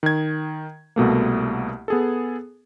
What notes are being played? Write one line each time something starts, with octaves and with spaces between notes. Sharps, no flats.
D#3 G#6
C2 B2 A3 A#3
B3 G#4 A4